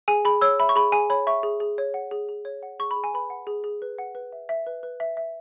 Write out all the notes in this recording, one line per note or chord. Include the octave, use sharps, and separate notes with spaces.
G#4 G#5
G#4 B5
C#5 E6
E5 B5
C#6
G#4 B5
G#4 G#5
C#5 B5
E5 C#6
G#4
G#4
C#5
F#5
G#4
G#4
C#5
F#5
G#4 C#6
B5
G#4
G#5
B4 B5
F#5
G#4
G#4
B4
F#5
B4
E5
E5
B4
B4
E5
E5